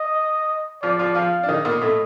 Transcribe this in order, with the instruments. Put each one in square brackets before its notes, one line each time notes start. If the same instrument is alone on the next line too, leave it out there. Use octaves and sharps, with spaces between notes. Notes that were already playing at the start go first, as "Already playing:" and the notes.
Already playing: [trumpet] D#5
[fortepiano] F3 F4 [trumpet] D5
[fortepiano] F3 F4
[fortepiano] F3 F4 [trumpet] F5
[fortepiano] D4
[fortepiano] D#3 D#4 [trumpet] D#5
[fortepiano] A#2 A#3
A2 A3